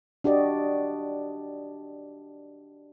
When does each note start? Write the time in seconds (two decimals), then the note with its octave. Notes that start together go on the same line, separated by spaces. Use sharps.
0.24 D4 F#4 G4 D5 D#5